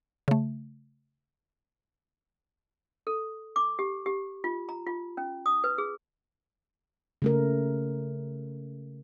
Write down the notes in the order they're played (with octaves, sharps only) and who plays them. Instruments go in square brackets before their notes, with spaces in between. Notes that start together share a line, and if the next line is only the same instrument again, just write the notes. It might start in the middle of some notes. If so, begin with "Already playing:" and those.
[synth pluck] C#3 A3
[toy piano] A4
D6
G4
G4
F4
A#5
F4
C#4
D#6
B4
G#4
[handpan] C#3 A3 A#4